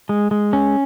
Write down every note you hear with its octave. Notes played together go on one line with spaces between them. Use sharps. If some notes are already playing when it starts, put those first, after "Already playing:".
G#3
G#3
C#4